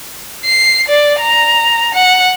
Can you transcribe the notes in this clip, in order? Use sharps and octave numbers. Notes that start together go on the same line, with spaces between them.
C7
D5
A#5
F#5